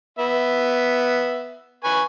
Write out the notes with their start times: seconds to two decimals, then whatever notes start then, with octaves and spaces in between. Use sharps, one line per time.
0.19 B3 E5
1.84 B4 G#5 C#6